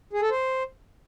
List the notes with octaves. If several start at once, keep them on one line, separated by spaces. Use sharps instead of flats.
G#4
A4
C5